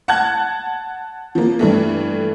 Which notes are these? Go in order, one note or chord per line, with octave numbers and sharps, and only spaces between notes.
F#5 A5 F#6 G#6
F3 A#3
G2 E3 A3